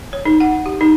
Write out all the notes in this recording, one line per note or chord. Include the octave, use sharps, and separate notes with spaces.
C#5
D#4
F#5
G4
D#4